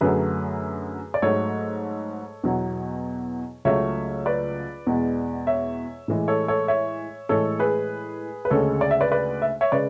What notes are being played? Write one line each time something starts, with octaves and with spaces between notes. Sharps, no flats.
F#2 D3 F#3 A3 G#4 B4
D5
G#2 F#3 A3 A4 C#5
E2 B2 F#3
C#2 C#3 F#3 A3 C#5 E5
B4 D5
E2 B2 G#3
C#5 E5
A2 E3 G#3
A4 C#5
A4 C#5
C#5 E5
A2 E3 G#3 A4 C#5
G#4 B4
B4
D2 C#3 G#3 A4 C#5
D5
E5
B4 D5
B4 D5
E5
C#5 E5
C#3 G#3 B4 D5